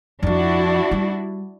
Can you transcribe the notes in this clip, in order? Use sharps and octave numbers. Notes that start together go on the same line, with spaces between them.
F2 F3 D4 E4 F#4
G3